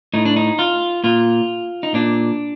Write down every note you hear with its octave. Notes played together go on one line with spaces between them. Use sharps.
A2 D#4
D4
D#4
F4
A#2 F4
D#4
A#2 D4